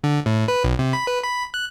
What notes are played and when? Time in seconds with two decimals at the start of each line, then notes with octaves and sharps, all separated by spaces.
0.04 D3
0.26 A2
0.48 B4
0.64 B1
0.79 C3
0.93 B5
1.07 B4
1.23 B5
1.54 F#6